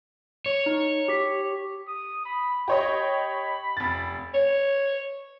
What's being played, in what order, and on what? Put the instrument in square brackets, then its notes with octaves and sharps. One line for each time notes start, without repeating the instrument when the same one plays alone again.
[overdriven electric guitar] C#5
[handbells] D#4
G4 B6
[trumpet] D#6
B5
[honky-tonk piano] G4 C#5 D#5 [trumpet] B5
[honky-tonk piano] F1 A6
[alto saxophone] C#5